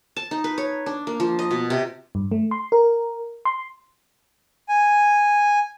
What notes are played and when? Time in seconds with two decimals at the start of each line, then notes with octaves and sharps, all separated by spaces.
0.16 A5
0.31 D#4
0.44 B4
0.58 C#5
0.86 D4
1.07 A#3
1.20 F3
1.39 D#5
1.51 B2
1.70 C3
2.15 G2
2.32 A3
2.51 C6
2.72 A#4
3.45 C6
4.68 G#5